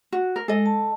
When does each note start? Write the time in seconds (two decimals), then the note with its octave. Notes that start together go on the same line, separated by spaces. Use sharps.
0.12 F#4
0.36 A#4
0.48 G#3 A4 D#5
0.66 A5